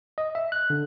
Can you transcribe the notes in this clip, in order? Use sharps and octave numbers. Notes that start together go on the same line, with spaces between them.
D#5
E5
F#6
D3